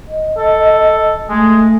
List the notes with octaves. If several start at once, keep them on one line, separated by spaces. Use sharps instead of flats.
D#5
A4
G#3 A3